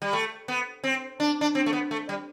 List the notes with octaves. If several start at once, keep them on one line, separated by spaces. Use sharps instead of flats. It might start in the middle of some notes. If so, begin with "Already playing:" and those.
G3
A3
B3
C4
D4
D4
C4
A3
B3
A3
G3